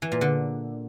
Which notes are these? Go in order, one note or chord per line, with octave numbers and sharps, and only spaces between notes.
E3
A#2
D3